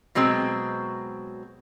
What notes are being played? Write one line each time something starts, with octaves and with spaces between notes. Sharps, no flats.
B2 F#3 G#3 C4